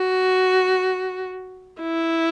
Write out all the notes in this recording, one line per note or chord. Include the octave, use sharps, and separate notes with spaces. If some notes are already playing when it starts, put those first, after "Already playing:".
Already playing: F#4
E4